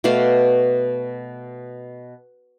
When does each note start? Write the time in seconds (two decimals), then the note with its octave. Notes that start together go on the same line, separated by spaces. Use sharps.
0.04 B2 A3 D5 F5